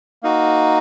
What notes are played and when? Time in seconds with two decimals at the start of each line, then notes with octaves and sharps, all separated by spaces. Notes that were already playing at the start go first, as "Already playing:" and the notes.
0.23 A#3 D#4 F#4